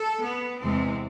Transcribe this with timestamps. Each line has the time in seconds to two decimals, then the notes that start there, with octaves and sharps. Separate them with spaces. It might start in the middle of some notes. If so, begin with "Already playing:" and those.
Already playing: A4
0.25 B3
0.62 E2 C3 E3 G#3 C4